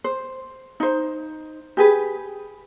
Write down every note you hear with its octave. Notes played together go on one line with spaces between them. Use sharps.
C5
D#4 C5
G4 G#4 B4